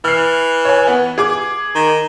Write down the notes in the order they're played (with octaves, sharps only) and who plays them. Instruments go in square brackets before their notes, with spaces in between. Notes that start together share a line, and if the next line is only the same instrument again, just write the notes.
[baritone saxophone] E3 [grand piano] F6 C7
[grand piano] C#5 G#5
B3
G#4 D6 G#6
[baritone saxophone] D#3